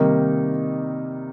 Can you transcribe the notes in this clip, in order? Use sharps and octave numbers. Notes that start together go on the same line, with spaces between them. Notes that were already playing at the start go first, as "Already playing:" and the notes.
Already playing: C3 D#3 G3 A#3 D#4